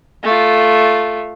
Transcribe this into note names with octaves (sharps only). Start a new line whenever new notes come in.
A3 F4